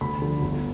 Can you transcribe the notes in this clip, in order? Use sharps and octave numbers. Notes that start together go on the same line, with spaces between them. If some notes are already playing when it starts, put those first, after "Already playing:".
D2 B5
D3 F3
G1